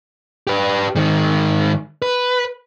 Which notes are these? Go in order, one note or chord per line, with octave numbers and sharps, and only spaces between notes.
G4 B4
G#2 D#3
B4